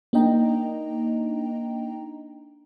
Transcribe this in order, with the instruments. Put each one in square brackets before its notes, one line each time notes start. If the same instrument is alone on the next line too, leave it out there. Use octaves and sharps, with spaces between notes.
[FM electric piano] A#3 D4 D#4 D#5 G5 A#5